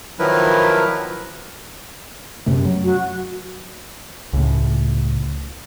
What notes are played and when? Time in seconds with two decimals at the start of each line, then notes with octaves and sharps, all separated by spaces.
0.19 D#3 F3 F#3 E4 A#4 B4
2.46 F#2 C3 A3
2.65 F#3
2.84 F#4
4.33 C#2 A2